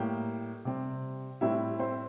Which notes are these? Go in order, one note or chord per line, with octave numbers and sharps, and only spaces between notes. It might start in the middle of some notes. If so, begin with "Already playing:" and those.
Already playing: A2 G3 A#3 G4 G5
C3 G3 C4
A2 G3 C4 E4 E5
C4 C5